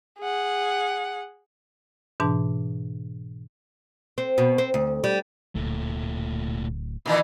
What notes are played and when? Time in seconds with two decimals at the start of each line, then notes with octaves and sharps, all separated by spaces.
0.20 G#4 F#5
2.20 G#2 B2 E3 D4 A5
4.18 C4
4.38 B2
4.58 C4
4.74 D2
5.04 G3
5.55 D1 A#2 A3
7.06 A#2 D#3 E3